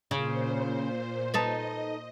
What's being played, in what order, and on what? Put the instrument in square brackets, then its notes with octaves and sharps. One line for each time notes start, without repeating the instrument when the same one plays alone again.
[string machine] A#2 C5 [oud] C#3
[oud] D#4 A4 B4 [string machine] D#5